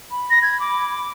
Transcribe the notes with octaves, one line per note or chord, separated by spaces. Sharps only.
B5
A#6
G#6
D6